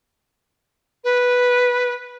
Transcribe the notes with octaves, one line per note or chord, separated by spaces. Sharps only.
B4